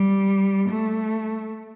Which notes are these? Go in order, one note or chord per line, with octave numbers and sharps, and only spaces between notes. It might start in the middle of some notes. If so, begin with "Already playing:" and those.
Already playing: G3
A3